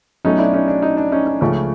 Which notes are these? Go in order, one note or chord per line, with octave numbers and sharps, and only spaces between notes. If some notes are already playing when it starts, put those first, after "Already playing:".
B1 B2 F#3 A3 C#4 D#4
D4 E4
C#4 D#4
D4
C#4 D#4
D4
C#4 D#4
C#4
C#2 C#3 F3 A3 C#4